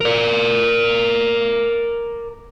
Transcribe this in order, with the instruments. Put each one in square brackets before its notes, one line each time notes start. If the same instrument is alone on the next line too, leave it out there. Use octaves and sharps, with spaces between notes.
[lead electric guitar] A#4 D5